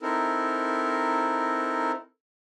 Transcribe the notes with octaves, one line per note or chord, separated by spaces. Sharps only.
C4 D#4 E4 A4 A#4